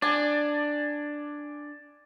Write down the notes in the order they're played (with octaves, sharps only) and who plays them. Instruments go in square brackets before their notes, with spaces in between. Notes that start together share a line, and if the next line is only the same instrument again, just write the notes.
[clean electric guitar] D4 [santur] D5 G#5